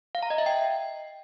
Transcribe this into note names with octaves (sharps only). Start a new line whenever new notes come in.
F5
A#5
D#5
E5
G5